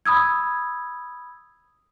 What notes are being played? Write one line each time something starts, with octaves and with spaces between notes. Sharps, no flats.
B5 D#6 E6 G#6